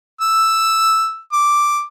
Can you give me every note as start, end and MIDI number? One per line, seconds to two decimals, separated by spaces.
0.21 1.19 88
1.32 1.83 86